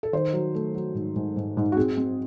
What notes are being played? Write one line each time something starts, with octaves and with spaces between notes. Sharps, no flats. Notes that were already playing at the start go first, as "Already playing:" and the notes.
A4
D#3 C5
F#3
A3
F#3
G#2
G#2
G#2
G#2
F#4
C4 G#4
C4